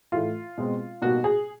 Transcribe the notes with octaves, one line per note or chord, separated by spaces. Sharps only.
A2 E3 A3 F4
B2 G#3 C4
B2 G3 A#3 D#4 F#4
G#4